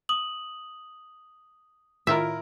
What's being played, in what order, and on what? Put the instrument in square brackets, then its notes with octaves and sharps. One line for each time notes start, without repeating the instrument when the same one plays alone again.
[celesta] D#6 F#7
[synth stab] A2 D#3 F4 [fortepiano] E4 A#4 [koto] E5